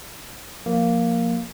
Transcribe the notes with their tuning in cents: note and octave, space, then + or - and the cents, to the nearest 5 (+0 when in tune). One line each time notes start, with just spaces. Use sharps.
F3 +20 A#3 +0